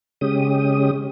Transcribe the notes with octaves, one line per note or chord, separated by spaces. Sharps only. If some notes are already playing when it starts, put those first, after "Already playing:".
C#3 G#3 C#4 G4 D#6